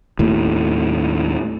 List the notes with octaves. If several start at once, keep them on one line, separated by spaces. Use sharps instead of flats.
D#2 A2